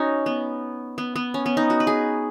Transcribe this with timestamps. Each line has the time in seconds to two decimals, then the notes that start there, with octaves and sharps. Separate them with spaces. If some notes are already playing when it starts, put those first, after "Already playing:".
Already playing: C#4 D#4 F#4
0.26 B3
0.98 B3
1.16 B3
1.34 C#4
1.46 B3
1.57 D#4
1.70 F#4
1.80 B4
1.87 G#4